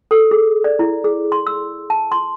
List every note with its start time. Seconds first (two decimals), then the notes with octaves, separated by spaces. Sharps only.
0.11 A4
0.31 G#4
0.64 D5
0.79 E4
1.04 G#4
1.32 C6
1.47 E6
1.90 A5
2.12 C6